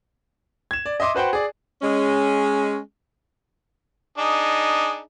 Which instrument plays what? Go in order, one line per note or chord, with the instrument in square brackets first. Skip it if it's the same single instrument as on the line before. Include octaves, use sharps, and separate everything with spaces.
[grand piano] G#6 E7
D5
D#5 E5 C6 D6 D#6
F#4 B4 C5 F#5 G5
G#4 D5
[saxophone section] G#3 C#4
[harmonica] D4 D#4 G#4